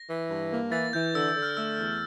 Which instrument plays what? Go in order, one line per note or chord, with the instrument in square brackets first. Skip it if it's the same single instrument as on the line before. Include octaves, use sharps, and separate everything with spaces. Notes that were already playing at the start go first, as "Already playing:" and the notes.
Already playing: [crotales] A#6
[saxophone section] E3
G2
A#3
[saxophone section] E3 [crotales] A6
[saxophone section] E3 [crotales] G6
[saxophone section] D3 [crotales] E6
[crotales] E6
[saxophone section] D3
[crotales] F6
[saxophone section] A3 [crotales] E6
[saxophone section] E2